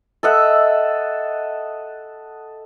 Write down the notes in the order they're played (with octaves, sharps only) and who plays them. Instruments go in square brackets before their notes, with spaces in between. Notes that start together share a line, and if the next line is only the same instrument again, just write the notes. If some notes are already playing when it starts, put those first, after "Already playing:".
[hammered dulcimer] A4 D#5 E5 F#5